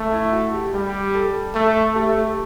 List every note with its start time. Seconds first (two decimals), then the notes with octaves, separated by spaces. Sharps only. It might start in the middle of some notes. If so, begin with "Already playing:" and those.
Already playing: A3
0.13 E4
0.32 F#4
0.54 G4
0.73 G3 G4
1.15 A4
1.55 A3 A4
1.96 A3 G4
2.09 A4
2.23 G4